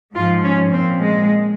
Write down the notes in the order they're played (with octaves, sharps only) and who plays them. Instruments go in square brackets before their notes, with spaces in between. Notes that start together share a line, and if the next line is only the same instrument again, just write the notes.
[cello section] G#2 F3 F4
C#4
A#2 F3 C4
G#3